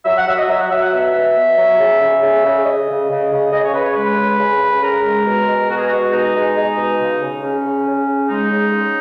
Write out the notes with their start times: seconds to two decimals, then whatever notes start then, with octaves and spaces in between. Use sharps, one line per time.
0.04 F#3 E5
0.16 F#5
0.27 F#3 E5
0.37 D#5
0.48 F#3 E5
0.59 F#5
0.69 F#3 E5
0.81 F#5
0.92 B2 E5
1.14 B2
1.35 B2
1.56 F#3
1.79 C#3
1.99 C#3
2.22 C#3
2.43 C#3
2.64 C#3 D#5
2.87 C#3
3.09 C#3
3.31 C#3
3.51 C#3 D#5
3.63 C#5
3.73 C#3 B4
3.84 C#5
3.95 G#3 B4
4.16 C#3
4.38 C#3
4.60 C#3
4.81 C#3 A#4
5.03 G#3
5.25 B2
5.46 G#3
5.69 B2 F#4
5.77 G#4
5.85 G#3 F#4
6.12 B2 D#4
6.34 G#3
6.55 G#3
6.77 B2
6.98 C#3
7.20 C#3
7.41 C#3 C#4
7.64 C#3
7.86 C#3
8.06 C#3
8.28 G#3 D#4
8.51 C#3
8.72 C#3